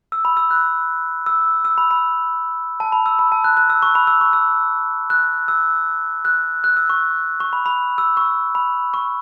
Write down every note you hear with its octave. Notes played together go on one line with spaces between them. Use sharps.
E6
B5
E6
F#6
E6
E6
B5
B5
A5
B5
E6
B5
A5
F#6
F#6
E6
C#6
B5
E6
C#6
E6
F#6
E6
F#6
F#6
E6
C#6
C#6
B5
B5
E6
C#6
B5
C#6